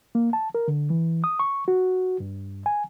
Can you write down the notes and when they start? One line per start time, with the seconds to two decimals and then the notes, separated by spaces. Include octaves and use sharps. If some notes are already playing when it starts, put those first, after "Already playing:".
0.15 A#3
0.33 A5
0.55 A#4
0.68 D3
0.90 E3
1.24 D#6
1.39 C#6
1.68 F#4
2.20 G2
2.66 G#5